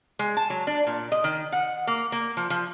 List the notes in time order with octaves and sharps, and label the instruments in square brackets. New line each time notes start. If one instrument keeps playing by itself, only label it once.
[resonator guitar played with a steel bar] G#3
A5
F#3
D4
A#2
D#5
D#3
F#5
A#3
A#3
F3
F3